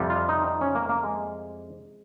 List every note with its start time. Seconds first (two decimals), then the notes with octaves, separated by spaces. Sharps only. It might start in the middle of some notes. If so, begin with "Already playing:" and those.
Already playing: F2 C3 G3
0.10 F4
0.29 D#4
0.48 D#4
0.61 C#4
0.75 A#3
0.89 A#3
1.04 G#3